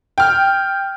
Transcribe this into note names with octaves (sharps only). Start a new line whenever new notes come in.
G5 F6